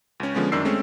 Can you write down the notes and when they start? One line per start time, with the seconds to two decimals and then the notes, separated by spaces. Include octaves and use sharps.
0.20 C#2 C#4
0.34 D3 F3 G#3 B3 C#4
0.52 F#2 D#3 D4 E6 C7
0.65 G#3 A3 C4 C#4